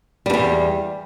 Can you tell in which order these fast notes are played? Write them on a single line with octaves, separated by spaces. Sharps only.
G3 G2 E2